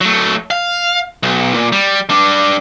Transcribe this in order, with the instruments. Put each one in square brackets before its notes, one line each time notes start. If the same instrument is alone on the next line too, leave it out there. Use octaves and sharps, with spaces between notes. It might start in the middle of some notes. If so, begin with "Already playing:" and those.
[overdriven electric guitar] F#3 A3
F5
B1
A#2
G3
G3 D4